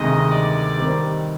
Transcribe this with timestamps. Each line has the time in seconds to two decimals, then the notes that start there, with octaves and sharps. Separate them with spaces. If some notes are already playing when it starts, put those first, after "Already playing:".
Already playing: D2 C3 D#3 G#3 D#5
0.31 D5
0.78 D#3 G3 C4 G4 A#4